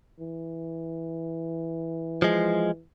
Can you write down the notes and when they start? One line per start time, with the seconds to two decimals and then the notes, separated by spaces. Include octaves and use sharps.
0.20 E3
2.22 F3 G#3